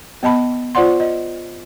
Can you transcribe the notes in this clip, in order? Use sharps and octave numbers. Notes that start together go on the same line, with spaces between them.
B3 D#5 A5 B5
F4 C5 D5 F#5 C6
D#5